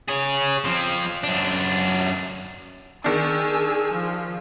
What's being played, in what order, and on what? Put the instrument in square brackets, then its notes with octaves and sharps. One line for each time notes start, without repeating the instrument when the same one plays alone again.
[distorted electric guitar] G#4 C#5
F3 C4
F#2 D4
[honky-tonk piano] D#3 D4 [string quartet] G#4 G#5 E6
[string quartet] F3